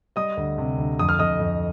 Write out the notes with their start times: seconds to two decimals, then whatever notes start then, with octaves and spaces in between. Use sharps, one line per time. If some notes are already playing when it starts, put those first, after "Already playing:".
0.16 G3 D#5 D#6
0.37 D2
0.58 C3
0.78 D2
0.99 F2 D#6
1.09 F6
1.19 F2 D#5 D#6
1.40 F2